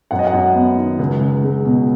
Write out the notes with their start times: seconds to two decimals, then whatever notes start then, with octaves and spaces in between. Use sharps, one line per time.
0.11 F#2 F#5
0.19 D#5
0.27 F#5
0.33 F#2
0.55 B3
0.77 D#3
0.99 C#2
1.21 C#2
1.43 G#3
1.65 B2